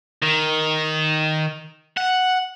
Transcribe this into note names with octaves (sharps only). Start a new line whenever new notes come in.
D#3
F#5